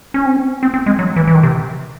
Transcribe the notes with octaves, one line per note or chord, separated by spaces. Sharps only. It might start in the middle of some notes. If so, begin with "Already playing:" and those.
C#4
C4
C4
C4
G#3
F#3
E3
E3
D#3
C3